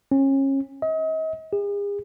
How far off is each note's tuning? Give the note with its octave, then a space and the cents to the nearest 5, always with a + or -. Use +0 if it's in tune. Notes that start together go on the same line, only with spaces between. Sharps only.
C#4 -30
D#5 +40
G#4 -45